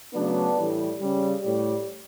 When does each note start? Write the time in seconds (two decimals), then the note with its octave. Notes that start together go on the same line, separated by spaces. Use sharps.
0.14 C#3 F#3 A3 B3 D4
0.57 A2 E3 G3
1.00 C#3 G3
1.42 A2 G3